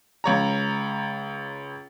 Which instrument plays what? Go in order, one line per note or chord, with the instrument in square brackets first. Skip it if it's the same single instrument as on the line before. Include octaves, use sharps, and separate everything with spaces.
[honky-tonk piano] C#2 C#5 A#5